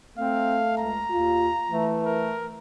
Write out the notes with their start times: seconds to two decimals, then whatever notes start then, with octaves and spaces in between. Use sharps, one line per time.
0.18 A3 C4 F5
0.78 C#2 A#5
1.10 D#2 F4
1.71 E3 A3
2.06 A#4